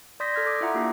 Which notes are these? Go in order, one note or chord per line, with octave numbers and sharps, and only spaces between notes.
D5 C6 D#6 G6 A#6 B6
A4 F6 G#6
D6 D#6
E4 F4 E5 F#5 A#5
A#3 D4 E4 F4 G4